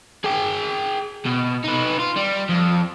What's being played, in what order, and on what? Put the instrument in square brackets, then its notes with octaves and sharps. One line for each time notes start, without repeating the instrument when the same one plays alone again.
[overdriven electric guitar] G#4 G5
B2
D#4 B4
F4
G3
F2